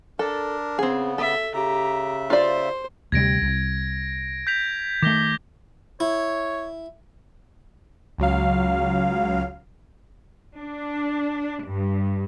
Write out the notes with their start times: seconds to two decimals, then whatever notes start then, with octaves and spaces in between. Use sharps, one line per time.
0.19 D4 A4 A#4
0.79 C#3 B3 C4 G#4
1.18 A4 E5
1.54 C#3 G4 E5 A#5
2.30 F4 C5 D5
3.12 D2 C3 G3 G#6 A#6 D7
3.41 C2
4.47 G6 B6 F7
5.02 D#3 A3 D6 A#6 G7
6.00 E4 C#5
8.18 C#2 F#3 F5
10.58 D4
11.66 G2